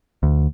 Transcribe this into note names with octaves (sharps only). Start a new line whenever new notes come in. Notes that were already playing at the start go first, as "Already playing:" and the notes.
D2